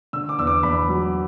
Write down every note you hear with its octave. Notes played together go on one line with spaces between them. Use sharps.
D3 E6
D6
E2 E6
D6
E2 B5
F#3